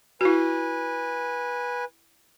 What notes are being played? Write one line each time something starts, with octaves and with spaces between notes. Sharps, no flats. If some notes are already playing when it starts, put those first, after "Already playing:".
E4 F#4 B4 G#5